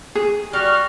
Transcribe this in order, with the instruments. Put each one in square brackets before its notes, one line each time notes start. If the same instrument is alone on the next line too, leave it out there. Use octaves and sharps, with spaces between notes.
[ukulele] G#4
[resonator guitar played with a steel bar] G3 [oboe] F#4 [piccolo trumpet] F6